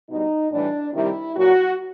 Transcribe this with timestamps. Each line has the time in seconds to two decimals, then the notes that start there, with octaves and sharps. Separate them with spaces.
0.09 B2 G3 D#4
0.51 A2 E3 G3 D4
0.93 C3 D#3 G3 E4
1.36 A#2 F#3 F#4